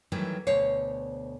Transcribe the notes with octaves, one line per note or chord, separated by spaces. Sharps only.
D#3 E3 F#3 G3 A3
D2 B2 C5 C#5 F5